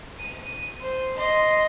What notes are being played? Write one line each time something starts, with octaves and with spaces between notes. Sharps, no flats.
D#7
C5
D#5 C6